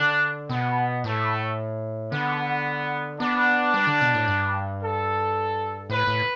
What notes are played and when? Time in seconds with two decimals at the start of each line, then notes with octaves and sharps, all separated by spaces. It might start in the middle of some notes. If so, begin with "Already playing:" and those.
Already playing: D3 D4
0.49 B2 B3
1.04 A2 A3
2.12 D3 B3
3.19 B3 D4
3.74 G3
3.87 D3
4.01 B2
4.14 A2
4.28 G2
4.82 A4
5.90 A2 B4
6.07 A2